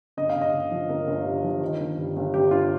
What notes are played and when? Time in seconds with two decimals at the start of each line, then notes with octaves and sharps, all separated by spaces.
0.17 G1 D#5
0.29 F5
0.35 G1
0.41 D#5
0.53 G1
0.71 F3
0.89 G1 A#4
1.07 G1
1.25 G2
1.44 F3
1.61 D#3
1.80 G1
1.97 G2
2.16 G1
2.34 G2 G4
2.51 G2 F4